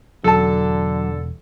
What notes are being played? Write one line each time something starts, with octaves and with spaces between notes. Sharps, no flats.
E1 D3 F#3 A4 A5